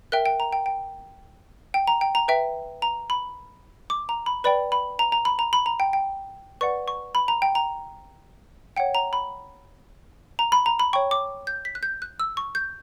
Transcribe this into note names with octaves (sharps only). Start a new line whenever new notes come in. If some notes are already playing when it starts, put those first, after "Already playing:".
A#4 E5 G5 F#6
G5
A#5
G5
G5
G5
A#5
G5
A#5
B4 E5 G5
A#5
B5
D6
A#5
B5
B4 D5 G5 B5
B5
A#5
A#5
B5
A#5
B5
A#5
G5
G5
B4 D5 F#5 C#6
C#6
B5
A#5
G5
A#5
C#5 F#5 G5
A#5
B5
A#5
B5
A#5
B5
C#5 G5 C#6
D6
G6
B6
F#6
G6
F#6
E6
C#6
G6